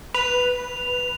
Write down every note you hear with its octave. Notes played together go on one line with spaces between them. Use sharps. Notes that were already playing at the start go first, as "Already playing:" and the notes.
B4 F7